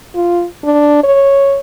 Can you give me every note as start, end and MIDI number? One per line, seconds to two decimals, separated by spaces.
0.15 0.45 65
0.64 1.01 62
1.04 1.60 73